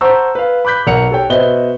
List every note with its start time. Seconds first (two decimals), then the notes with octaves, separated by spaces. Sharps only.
0.01 C5 F#5 A5 A#5 C#6 E6
0.35 B4 F5
0.65 B5 D6 F#6 G6 B6
0.87 B1 A#4 F#5 C#7 F7
1.11 G4 A4 C#5 G5
1.30 B2 B4 C5 D#5 E5 G7